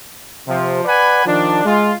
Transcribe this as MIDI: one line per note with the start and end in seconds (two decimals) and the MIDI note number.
0.48 0.82 48
0.48 0.82 53
0.85 1.26 71
0.85 1.26 74
0.85 1.26 78
0.85 1.26 80
0.85 1.26 83
1.26 1.65 51
1.26 1.65 53
1.26 1.65 62
1.65 1.93 56
1.65 1.93 65